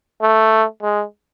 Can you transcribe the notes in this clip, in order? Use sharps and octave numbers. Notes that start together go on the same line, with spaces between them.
A3
G#3